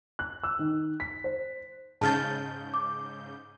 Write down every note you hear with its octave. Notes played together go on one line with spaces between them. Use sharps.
F#6
E6
D#3
B6
C5
G#2 C#3 A5 F6 G6 A6
D6